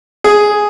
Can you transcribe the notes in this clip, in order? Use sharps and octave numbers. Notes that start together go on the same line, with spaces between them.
G#4